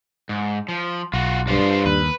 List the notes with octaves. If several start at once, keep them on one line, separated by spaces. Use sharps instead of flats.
G#2
F3
B1 F4 F#4
G2 D4 F4 C5
D#2 B4